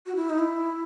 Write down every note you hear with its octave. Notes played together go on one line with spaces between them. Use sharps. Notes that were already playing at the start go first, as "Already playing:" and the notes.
F#4
E4
D#4
E4